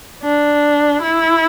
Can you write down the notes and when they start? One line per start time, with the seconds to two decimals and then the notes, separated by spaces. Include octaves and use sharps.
0.23 D4
1.02 E4